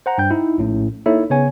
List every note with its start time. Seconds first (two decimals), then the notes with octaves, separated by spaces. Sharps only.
0.06 C5 F#5 A#5
0.18 G2 G5 G6
0.31 D#4 E4
0.58 A#1 A2 C#4
1.06 A#3 D#4 E4 A4 C#5 E5
1.30 C#3 B3 C#5 G#5